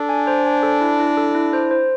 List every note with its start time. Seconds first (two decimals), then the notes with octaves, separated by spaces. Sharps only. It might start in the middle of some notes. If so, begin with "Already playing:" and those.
Already playing: D4 A4
0.09 G#5
0.27 C5
0.46 G#5
0.63 A4
0.81 E4
1.00 E4
1.17 A4
1.35 E4
1.53 C5
1.71 C5